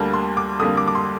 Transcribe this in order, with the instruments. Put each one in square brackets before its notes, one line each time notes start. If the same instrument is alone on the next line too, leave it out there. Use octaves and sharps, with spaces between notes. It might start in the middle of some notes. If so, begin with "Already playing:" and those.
Already playing: [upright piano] D2 D3 G3 A#3 A5
C6
D6
F2 D3 G3 A#3 D#6
D6
D6
C6